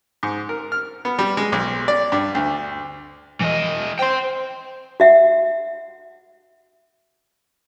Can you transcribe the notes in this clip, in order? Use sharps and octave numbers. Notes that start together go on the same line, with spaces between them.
G#2
A#4
F6
B3
G3
G#3
B1
D5
G2
D2
E3 D#5
C5 G5 C6
F#4 E5 F#5